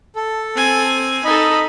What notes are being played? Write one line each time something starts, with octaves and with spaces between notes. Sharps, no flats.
A4
C4 G#5
D#4 A4 D#5 B5